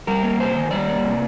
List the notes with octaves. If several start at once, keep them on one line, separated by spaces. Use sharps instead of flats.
G3 A#4
A#3
C3 C5
D#3
G3 D5
A#3
C3